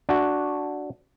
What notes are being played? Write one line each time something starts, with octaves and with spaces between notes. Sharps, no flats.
D4 F#4